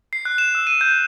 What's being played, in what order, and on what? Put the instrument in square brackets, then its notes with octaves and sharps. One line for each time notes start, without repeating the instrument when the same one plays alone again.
[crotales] C7
F#6
E7
E6
D#7
G6